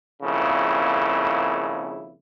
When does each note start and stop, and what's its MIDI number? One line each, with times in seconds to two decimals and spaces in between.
0.22 2.12 32
0.22 2.12 41
0.22 2.12 49
0.22 2.12 58
0.22 2.12 64